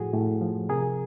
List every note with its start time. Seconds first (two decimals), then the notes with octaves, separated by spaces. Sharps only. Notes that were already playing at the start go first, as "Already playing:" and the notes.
Already playing: A2 F3 A3 F#4 G#4
0.13 A2
0.41 F3
0.69 C3 G#4 A#4